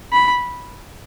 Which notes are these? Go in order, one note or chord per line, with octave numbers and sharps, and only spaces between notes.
B5